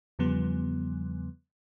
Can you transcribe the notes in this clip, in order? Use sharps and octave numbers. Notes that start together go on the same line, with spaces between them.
E2 C#3 F3 G3 B3